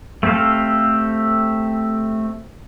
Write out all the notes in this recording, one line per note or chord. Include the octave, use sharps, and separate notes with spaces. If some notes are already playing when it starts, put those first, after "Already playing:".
A3 C4 G4 A4 F5